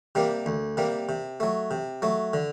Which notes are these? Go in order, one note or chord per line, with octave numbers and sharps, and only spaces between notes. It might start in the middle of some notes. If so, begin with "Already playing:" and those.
C3 G3 A#3
D2
C3 G3 A#3
C3
F#3 A3
C3
F#3 A3
D3